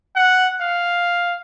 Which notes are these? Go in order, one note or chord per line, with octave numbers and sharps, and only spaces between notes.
F#5
F5